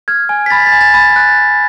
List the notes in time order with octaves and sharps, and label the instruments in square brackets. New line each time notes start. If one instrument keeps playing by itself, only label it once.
[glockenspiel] F6 G#6
G#5
B6
B5 A6
A6
G#5
A6
B5 A6
A6
F#6